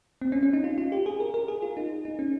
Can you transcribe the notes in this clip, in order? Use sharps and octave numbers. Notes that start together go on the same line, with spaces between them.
C4
C#4
C#4
D#4
F4
F4
G4
G#4
A#4
A#4
G#4
F4
D#4
D#4
C#4